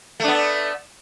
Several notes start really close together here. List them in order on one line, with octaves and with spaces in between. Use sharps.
A3 D4 B3